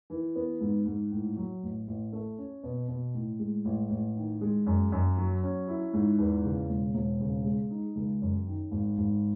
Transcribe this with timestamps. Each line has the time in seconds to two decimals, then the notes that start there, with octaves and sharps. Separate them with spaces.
0.10 E3
0.36 B3
0.61 G#2
0.86 G#2
1.12 A2
1.36 F#3
1.63 A1
1.88 A1
2.13 A3
2.38 C#4
2.63 B2
2.88 B2
3.14 A2
3.39 G#3
3.65 A1
3.90 A1
4.15 D#3
4.41 G#3
4.67 F#2
4.92 F#2
5.17 F#3
5.43 C#4
5.68 E4
5.93 G#2
6.18 E2
6.44 C#3
6.69 E1
6.94 E1
7.20 C#3
7.45 G#3
7.70 D#4
7.95 C#2
8.22 F#2
8.47 D#3
8.71 G#1
8.98 G#1